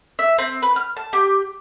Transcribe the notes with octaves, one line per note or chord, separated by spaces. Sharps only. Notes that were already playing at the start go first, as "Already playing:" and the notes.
E5
C4
B4
F6
A5
G4